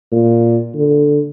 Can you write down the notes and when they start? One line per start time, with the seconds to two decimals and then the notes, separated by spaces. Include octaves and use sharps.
0.12 A#2
0.75 D3